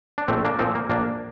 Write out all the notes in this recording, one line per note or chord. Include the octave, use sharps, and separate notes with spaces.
D4
A#1 A3 C4
A#3 D4
A#2 F3 C4 D#4
A#3
A#1 A#3 D4